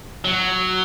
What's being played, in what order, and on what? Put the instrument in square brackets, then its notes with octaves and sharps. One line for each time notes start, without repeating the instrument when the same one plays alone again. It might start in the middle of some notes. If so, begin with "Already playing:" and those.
[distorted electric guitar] F#3